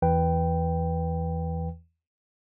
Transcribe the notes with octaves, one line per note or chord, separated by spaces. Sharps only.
E2 E3 B4 G5